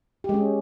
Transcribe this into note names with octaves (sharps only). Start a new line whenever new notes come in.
G#3 C#4 G4